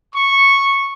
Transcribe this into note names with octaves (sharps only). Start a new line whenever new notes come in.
C#6